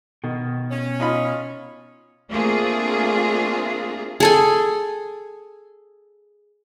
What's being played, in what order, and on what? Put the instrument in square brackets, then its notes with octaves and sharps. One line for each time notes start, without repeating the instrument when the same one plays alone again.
[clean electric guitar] B2 [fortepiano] D#3
[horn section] C#4
[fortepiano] D#4 F4 B5
[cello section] A3 A#3 C4 D4 F4 G#4
[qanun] G#4 A4 G#5